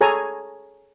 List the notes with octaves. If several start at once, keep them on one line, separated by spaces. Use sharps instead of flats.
G#4 A4 C#5 G#5 A#5